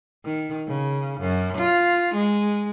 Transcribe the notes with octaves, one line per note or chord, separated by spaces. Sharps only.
D#3
C#3
F#2
F4
G#3